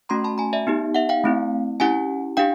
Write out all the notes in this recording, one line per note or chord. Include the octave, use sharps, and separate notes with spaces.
A3 C#4 F#4 A#5 C6
A5 B5
G#5 A#5
D5 E5
B3 D#4 G4
E5 F#5
F5 G5
A3 C4 E4
C#4 E4 G4 F#5 G#5
D4 G4 F5 G5